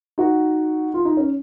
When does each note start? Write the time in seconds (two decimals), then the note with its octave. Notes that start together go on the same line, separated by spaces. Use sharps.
0.18 D#4 F#4
0.94 F4
1.05 D#4
1.17 C#4